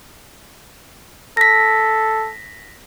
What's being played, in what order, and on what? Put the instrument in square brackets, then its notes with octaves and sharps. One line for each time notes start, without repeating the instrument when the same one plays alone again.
[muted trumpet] A4 [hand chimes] A#6 B6